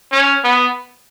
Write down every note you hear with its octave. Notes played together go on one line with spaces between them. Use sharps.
C#4
B3